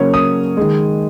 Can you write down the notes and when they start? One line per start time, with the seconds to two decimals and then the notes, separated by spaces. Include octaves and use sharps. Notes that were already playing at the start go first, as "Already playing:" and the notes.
Already playing: C#3 F#3 A#3 A#4 C#5
0.14 D#6
0.57 D#3 G#3